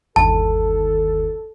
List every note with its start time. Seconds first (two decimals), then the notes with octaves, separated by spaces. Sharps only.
0.16 G1 D#2 A4 A5